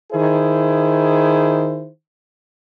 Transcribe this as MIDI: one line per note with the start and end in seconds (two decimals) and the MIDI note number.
0.12 1.88 51
0.12 1.88 64
0.12 1.88 68
0.12 1.88 72